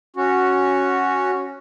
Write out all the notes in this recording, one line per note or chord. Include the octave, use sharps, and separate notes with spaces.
C#4 F#4